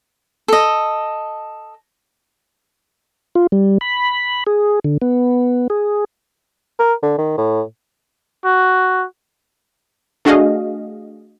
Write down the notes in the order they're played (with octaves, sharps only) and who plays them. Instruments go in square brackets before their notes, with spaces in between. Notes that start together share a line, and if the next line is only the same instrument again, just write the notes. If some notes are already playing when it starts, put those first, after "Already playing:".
[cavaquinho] A4 D#5
[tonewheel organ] F4
G3
B5
G#4
D3
B3
G#4
[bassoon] A#4
D3
D#3
A2
[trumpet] F#4
[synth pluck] A3 D4 F#4 G#4 D#5 F5